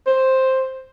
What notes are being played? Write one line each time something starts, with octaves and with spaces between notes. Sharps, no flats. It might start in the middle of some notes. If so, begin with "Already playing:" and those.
C5